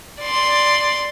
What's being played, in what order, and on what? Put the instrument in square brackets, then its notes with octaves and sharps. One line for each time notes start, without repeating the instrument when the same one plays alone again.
[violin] D5 C6